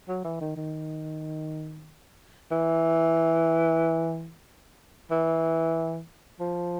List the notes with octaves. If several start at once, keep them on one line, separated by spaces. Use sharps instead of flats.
F#3
E3
D#3
D#3
E3
E3
F3